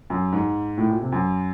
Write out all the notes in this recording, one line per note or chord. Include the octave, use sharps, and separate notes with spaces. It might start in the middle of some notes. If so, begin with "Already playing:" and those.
F#2
G#2
A2
A#2
C3
F#2